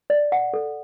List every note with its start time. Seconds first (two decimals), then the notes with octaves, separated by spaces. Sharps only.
0.10 D5
0.32 F#5
0.54 A4